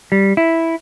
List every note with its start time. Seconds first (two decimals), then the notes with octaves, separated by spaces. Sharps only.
0.12 G3
0.37 E4